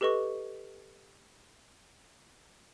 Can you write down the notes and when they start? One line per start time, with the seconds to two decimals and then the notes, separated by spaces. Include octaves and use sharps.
0.01 G4 A4 B4 D#5 C#6